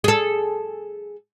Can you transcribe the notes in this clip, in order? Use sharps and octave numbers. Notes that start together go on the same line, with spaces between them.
G#4 A4